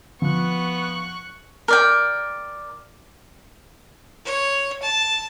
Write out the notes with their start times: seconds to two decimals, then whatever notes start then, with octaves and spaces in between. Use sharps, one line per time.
0.22 F3 B3 C#6 F#6
1.68 A#4 D5 G5
4.25 C#5
4.82 A5